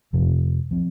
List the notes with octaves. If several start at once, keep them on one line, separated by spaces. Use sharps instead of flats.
F2 C3 F3 C4
F3 C4